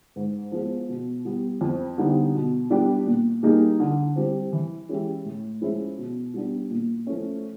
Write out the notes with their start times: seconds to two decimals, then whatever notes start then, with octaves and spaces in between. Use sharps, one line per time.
0.16 G#2
0.52 F3 G#3 B3
0.89 B2
1.25 G3 B3
1.61 F2
1.98 D3 G3 B3 D#4
2.34 B2
2.70 G3 B3 D4 G4
3.06 A#2
3.43 G3 A#3 D#4 G#4
3.80 D3
4.16 G3 C4
4.53 E3
4.89 G#3 C#4 E4 G4
5.25 A2
5.61 F3 G#3 C#4 E4
5.98 B2
6.34 G3 B3 D4
6.71 A#2
7.07 F3 A3 C#4